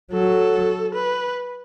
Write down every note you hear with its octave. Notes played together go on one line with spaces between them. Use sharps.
F#3 A4
B4